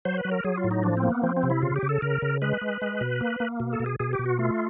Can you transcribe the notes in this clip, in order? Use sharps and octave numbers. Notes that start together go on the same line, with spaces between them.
F#3 C5
B4
F#3
A#4
F#3 G#4
F4
A2
D#4
F3 D4
C4
A#3
B3
F3 C4
C4
C3
E4
C#3 F4
G4
C#3
A4
C#3 A#4
C#3
G#3 B4
G#3
G#3
B2
A#3
A#3
B2
A4
B2
G#4
B2 G#4
G4
B2
F#4
A3 F4